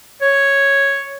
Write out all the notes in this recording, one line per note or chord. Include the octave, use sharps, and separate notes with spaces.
C#5